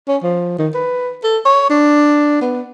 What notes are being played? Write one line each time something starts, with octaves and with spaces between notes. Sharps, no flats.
C#4
F3
D#3
B4
A4
C#5
D4
B3